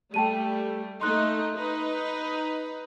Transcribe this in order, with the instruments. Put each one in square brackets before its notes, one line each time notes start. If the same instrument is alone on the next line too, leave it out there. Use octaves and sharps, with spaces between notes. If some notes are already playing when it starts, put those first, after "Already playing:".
[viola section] G3 A3 [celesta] G5 A5 D#7
[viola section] A3 D#4 [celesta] C6 F#6
[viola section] D#4 B4